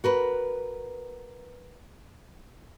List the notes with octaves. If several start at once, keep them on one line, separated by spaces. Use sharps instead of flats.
F#4 A#4 B4